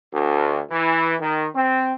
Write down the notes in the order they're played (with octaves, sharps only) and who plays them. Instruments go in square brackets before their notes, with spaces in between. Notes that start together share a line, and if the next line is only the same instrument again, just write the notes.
[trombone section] D2
E3
D#3
C4